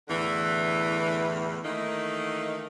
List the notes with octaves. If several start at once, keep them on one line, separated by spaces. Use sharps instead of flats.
E2 A2 D3 E3
D#3 E3 A3 A#3 D#4